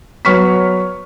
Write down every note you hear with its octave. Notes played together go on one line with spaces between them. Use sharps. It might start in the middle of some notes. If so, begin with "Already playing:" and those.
F#3 B3 C#5 C#6 F6 B6